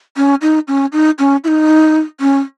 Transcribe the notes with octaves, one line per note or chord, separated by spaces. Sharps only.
C#4
D#4
C#4
D#4
C#4
E4
D#4
C#4